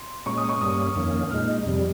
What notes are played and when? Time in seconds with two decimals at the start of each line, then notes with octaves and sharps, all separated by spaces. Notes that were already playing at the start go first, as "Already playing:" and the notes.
Already playing: C6
0.26 A#2 G#3 C#4 C#6
0.37 D#6
0.49 C#6
0.61 G2 G3 A#3 C#4 D#6
0.96 F2 D#3 A#3 C#4
1.30 A#2 G#3 D#4 F6
1.66 F2 C3 G3